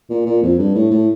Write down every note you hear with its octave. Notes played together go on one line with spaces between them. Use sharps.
A#2
A#2
F2
G2
A2
A2